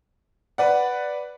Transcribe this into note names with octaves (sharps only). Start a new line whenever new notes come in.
B4 D5 F#5